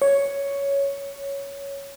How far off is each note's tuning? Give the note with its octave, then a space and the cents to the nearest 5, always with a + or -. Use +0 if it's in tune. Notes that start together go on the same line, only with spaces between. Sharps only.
C#5 +5